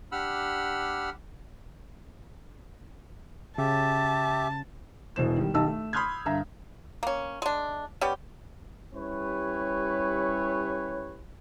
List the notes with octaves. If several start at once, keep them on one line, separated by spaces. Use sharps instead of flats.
D4 G4 F#5 B5 E6 F6
C#3 G4 E5 A5
E1 B2 E3 C5 E7
D#3 G3
B1 D#3 G4 D#5 A5 E6
A3
B5 C6 D#6 F6 G6 G#6
G2 D3 E5 F5 A#5
A#3 C#4
G#3 D4
G3 B3 C#4 G4
G3 C#4 E4 G4 B4 C#5